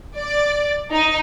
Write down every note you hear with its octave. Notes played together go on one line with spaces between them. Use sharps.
D5
D#4